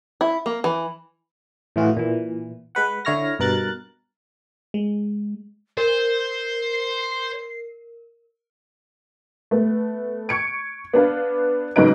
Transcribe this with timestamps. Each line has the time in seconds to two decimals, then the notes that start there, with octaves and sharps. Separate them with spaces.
0.21 E4
0.46 A#3
0.64 E3
1.76 A2 E3 F4 F#4 G#4
1.97 A#2 E3
2.75 G#3 B4 F#5
3.05 D3 E4 C#5 F6 A#6
3.39 G2 B2 A#4 F#6 A6
4.74 G#3
5.78 A#4 C5 G6
6.29 C7
9.51 A3 B3
10.29 C#6 G#6 C#7 D7
10.93 B3 D4 B4 F5
11.76 G#2 C#3 F#3 D#4 B4 D7